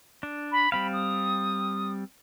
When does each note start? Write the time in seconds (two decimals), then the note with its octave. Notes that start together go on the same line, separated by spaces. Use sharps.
0.23 D4
0.52 B5
0.72 G3 C4 F5 B5
0.93 D#6